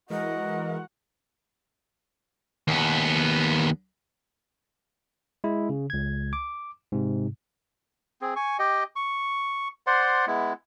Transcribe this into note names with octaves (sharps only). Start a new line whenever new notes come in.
E3 G#3 F#4 A#4 D#5 F#5
D#2 B3
G#3 E4
C#3
C#2 G#6
D6
G#2 C3
C4 G#4
G#5 C#6
G4 D#5 G5
C#6
C5 D5 F#5 C6
G#3 B3 E4